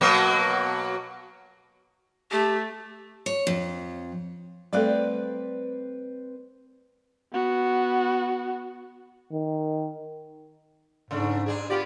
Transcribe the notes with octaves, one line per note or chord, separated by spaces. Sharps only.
B2 F#3 A#3
A3 G4
C#5
F2
G3 A3 C4 A4 B4 D5
B3 F#4
D#3
G#2 C#3 A3 D4
G2 D4 G#4
B3 F4 G4 D5